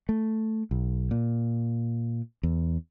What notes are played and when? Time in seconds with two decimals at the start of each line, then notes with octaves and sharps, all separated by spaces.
0.09 A3
0.71 B1
1.11 A#2
2.43 E2